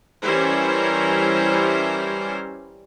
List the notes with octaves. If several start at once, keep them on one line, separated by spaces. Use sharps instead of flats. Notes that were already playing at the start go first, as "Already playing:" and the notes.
E3 G3 C#4 E4 A#4 C5